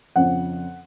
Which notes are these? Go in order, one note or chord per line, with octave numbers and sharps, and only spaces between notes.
F2 C#3 F3 F#5